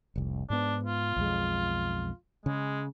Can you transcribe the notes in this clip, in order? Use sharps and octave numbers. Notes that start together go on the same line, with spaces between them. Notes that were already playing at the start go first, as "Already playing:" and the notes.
F1 C2
G#2 B3 D4
F4
B1 F2 G#3
C#3 G#3